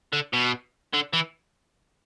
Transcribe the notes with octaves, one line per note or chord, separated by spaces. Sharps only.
D3
B2
D3
E3